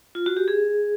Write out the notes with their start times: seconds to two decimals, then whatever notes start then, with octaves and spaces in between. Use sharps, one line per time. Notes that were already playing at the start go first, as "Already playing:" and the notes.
0.15 F4
0.26 F#4
0.37 G4
0.48 G#4